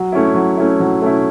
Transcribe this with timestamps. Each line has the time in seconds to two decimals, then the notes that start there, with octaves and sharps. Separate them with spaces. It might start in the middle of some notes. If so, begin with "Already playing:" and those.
Already playing: F#3
0.12 A3 C#4 E4
0.35 F#3
0.57 A3 C#4 E4
0.80 F#3
1.02 A3 C#4 E4